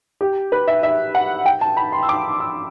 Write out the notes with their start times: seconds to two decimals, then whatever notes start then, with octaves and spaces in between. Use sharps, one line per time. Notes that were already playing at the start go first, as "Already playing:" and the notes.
0.21 G4
0.52 B4
0.67 E5
0.83 E5
1.15 F#5
1.46 G5
1.61 A5
1.77 B5
1.92 C6
2.03 E6
2.09 D6
2.40 E6